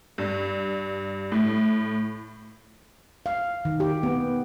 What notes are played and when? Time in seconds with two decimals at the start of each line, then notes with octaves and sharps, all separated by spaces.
0.18 G2
1.32 A2
3.26 F5
3.65 D#3
3.80 G4
4.03 B3